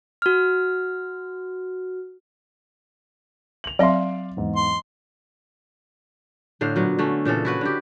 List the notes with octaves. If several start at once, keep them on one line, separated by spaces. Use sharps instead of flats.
F#4 F6
F7 F#7
F#3 C4 D5 E5 F5 C6
E2 G#2
C6
A2 D3 C5 F5
A#2 F#3 B3
D3 A3 C#4
A#2 C#3 E3 A4
E4 F#4 B4
D3 F#4 G4